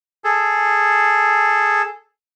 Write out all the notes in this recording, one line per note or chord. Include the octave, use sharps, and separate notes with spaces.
G#4 A4